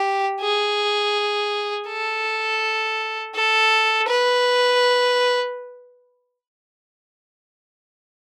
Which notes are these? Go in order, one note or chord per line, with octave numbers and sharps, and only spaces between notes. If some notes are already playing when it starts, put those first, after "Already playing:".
Already playing: G4
G#4
A4
A4
B4